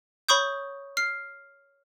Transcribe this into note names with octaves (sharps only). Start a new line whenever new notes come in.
C#5 B5 C#6 D#6 G6
F6 C7